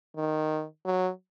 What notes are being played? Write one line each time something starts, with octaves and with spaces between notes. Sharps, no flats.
D#3
F#3